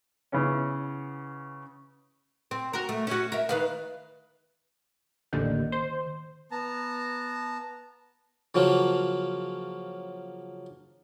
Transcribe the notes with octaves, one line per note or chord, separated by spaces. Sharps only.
C#3 E3 B3 C#4
C4
F#4 A#4
A3
C#4 F#4
A#4 E5
D#3 B4 F5
A1 D#2 D3 D#3
C5
B3 A5 A#5
C#3 F3 F#3 A#3